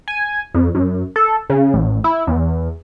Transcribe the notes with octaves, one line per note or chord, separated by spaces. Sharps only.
G#5
F2
F#2
A4
C#3
A1
E4
E2